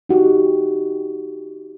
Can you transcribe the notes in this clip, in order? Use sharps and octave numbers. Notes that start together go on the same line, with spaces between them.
D#4 F#4 G4